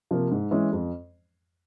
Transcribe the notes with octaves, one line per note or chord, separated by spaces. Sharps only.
C3 F3 A#3
G#2
E3 G#3 C#4
F2